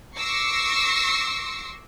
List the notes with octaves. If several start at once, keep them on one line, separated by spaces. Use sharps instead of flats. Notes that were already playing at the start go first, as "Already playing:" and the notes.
C#6 D6 E6 A#6 C7 C#7